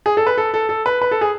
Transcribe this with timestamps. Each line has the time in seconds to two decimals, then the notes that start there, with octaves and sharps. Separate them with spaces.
0.06 G#4
0.17 A4
0.27 B4
0.38 A4
0.54 A4
0.69 A4
0.86 B4
1.02 B4
1.11 A4
1.21 G#4